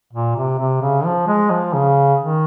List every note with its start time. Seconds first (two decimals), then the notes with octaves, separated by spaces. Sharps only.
0.13 A#2
0.36 C3
0.59 C3
0.82 C#3
1.05 F3
1.27 G#3
1.50 F3
1.73 C#3
2.19 D#3